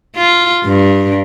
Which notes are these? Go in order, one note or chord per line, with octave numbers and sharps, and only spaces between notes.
F4
G2